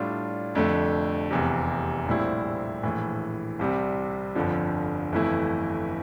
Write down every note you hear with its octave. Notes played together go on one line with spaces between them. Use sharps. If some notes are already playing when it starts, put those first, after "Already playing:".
Already playing: A2 G3 D4 F4
F1 F2 D3 A3 D4
F1 E2 C3
A#1 A2 G3 C4 E4
A#1 A2 E3
C2 C3 G3 C4
G1 F2 D3 F3
G1 F2 E3 A3 E4